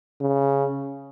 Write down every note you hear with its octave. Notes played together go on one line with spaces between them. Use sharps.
C#3